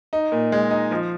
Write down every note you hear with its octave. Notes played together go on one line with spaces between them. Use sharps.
D#4
A#2
G#3
D#4
F3